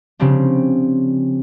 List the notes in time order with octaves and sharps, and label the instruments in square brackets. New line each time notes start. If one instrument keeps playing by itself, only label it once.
[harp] C#3 F3 G3 C4 D4